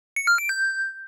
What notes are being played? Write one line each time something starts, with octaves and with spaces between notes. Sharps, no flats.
C#7
F6
D7
G6